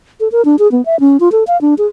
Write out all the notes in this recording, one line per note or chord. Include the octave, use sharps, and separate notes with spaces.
A4
A#4
D4
G#4
B3
E5
C#4
F4
A4
F5
D4
G#4